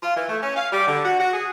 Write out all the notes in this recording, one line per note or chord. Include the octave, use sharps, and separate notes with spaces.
F4
E3
A3
C#4
F5
G3
D3
F#4
F#4
G#4